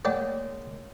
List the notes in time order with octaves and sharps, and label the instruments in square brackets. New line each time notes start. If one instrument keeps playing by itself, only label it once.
[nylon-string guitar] G#3 A#3 [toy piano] C#5 F#5 [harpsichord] D5 G5 A5